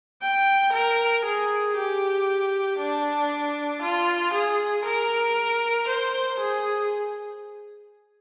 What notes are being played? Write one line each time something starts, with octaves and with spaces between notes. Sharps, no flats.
G5
A#4
G#4
G4
D4
F4
G#4
A#4
C5
G#4